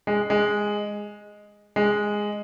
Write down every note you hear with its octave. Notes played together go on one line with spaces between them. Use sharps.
G#3
G#3
G#3